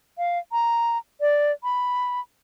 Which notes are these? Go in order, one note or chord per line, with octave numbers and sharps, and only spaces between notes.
F5
A#5
D5
B5